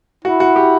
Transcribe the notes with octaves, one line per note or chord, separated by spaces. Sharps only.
E4 F#4
F#4
G4